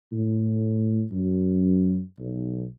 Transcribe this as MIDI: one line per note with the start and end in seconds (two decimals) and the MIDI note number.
0.13 1.03 45
1.11 1.99 42
2.19 2.64 35